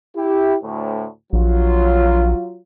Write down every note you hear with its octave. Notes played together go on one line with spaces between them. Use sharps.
E4 G4
D2 A2
A#1 F#3 F4